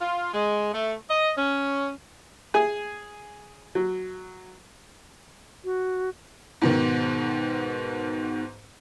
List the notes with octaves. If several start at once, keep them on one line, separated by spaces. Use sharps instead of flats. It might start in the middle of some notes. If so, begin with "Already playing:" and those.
F4
G#3
A3
D#5
C#4
G#4 G#5
F#3
F#4
G#2 B2 D#3